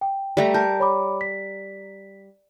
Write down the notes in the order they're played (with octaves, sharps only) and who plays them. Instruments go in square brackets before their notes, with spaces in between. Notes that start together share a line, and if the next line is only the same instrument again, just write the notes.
[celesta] G5
[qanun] G3 A3 A#5 [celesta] G5
[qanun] A#4 [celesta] A5 G6
[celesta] C#5 B5 D6
B6